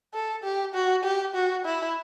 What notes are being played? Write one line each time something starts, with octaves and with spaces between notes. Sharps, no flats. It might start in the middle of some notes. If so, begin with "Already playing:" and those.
A4
G4
F#4
G4
F#4
E4